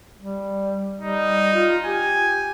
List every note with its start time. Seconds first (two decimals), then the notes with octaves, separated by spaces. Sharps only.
0.20 G3
1.01 G3 D#4
1.55 F4
1.85 G4 G#5